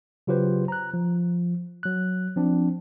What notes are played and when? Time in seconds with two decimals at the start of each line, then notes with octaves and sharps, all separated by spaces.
0.27 C#3 F#3 F4 G4 B4 C5
0.68 A#5 F#6
0.94 F3
1.83 F#3 F#6
2.36 F3 C4 D4